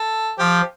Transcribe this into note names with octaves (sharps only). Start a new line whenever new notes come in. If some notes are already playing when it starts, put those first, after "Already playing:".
Already playing: A4
F3 G4